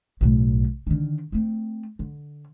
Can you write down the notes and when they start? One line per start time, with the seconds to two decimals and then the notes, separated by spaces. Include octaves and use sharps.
0.21 B1 A2
0.87 D3 D#3
1.32 A3 C4
1.99 D3